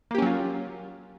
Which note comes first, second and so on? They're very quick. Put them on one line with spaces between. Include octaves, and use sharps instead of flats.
A#3 G4 C#4 F#3 F4